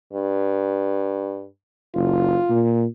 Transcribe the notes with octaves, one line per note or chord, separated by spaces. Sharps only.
G2
F#1 F4
A#2